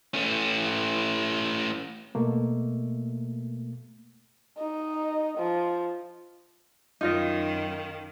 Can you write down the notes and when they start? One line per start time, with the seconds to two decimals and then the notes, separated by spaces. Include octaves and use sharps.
0.14 A3 C#4
2.15 B2 A3 A#3
4.58 D#4
5.38 F3
7.01 F#2 D#3 D#4 F4 D#5